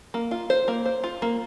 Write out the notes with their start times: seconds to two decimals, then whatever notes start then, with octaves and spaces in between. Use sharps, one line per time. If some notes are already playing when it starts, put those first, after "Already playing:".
0.14 A#3
0.31 F4
0.50 C5
0.68 A#3
0.86 C5
1.04 F4
1.22 A#3